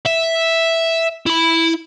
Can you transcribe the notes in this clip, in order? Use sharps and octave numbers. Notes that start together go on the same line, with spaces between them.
E5
E4 B5